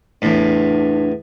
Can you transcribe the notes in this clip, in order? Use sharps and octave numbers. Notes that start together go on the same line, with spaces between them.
E2 A2 D4